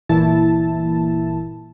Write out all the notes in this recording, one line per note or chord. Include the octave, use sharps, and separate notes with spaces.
G1 A#2 E3 E4 A5